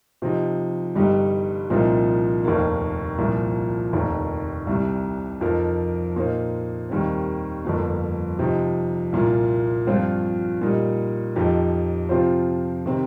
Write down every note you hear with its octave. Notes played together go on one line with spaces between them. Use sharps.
C3 F3 C4 D#4
G1 G2 G3 D#4 G4
C2 A#2 F3 C4 D#4
F1 D#2 D#3 A#3
C2 A#2 F3
F1 D#2 D#3
C2 C3 G3
F2 F3 D#4 A#4
A#2 A#3 D#4 C5
D#2 D#3 G3 C4
G1 F2 F3 A#3
C3 F3 C4 D#4
C2 A#2 A#3 F4
G2 F3 C4 F4 C5
A#2 G3 D#4
F2 F3 D#4 G4
C3 F3 C4 F4 C5
C3 D#3 C4